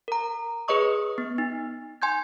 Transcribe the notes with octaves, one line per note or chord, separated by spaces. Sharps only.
A#4 A#5
G#4 B4 C#5 D#5 C#6 D#6
B3
D#4
G#5 C6 G6 G#6